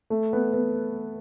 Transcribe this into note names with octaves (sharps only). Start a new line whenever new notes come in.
A3
B3
B3